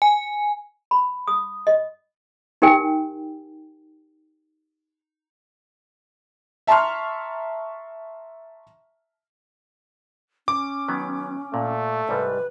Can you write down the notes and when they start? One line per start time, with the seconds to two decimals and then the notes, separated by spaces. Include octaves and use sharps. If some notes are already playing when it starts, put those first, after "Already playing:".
0.02 G#5
0.91 B5
1.28 D#6
1.67 D#5
2.62 D#4 G4 A#4 G5 G#5
6.67 E5 A5 A#5 C6 C#6 F6
10.48 C#4 D6
10.88 D#3 F#3 B3
11.54 A#2 A3
12.09 C2 G#2 G3 B4